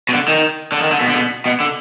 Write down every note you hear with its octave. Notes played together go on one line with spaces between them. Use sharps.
B2
D3
D#3
D3
D#3
D3
B2
D3
B2
B2
D3